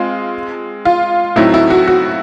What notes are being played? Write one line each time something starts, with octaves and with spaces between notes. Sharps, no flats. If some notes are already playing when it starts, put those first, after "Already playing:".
Already playing: G#3 C4 F4
F4
A2 F#3 A3 C4 D#4 E4
E4
F#4
F#4